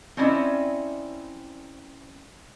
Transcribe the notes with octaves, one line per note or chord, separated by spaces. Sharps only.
C4 C#4 D#4 E4 D5